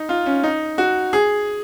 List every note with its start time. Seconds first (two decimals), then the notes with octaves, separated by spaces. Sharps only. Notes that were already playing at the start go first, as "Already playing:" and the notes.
Already playing: D#4
0.09 F4
0.26 C#4
0.43 D#4
0.78 F#4
1.13 G#4